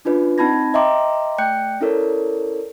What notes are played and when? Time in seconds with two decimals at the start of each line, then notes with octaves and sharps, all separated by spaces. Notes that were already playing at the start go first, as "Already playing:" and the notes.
0.05 C#4 D4 F4 B4 D5
0.38 C4 D#4 A5 B5 G#6 A#6
0.74 D#5 E5 G5 A#5 C6 D6
1.38 A3 D5 G5 F#6 G6 C#7
1.81 C#4 E4 A4 A#4 C#5 D5